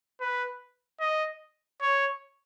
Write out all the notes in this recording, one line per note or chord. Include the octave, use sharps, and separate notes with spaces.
B4
D#5
C#5